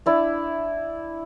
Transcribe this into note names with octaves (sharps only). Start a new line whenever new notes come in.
D4 E4 D5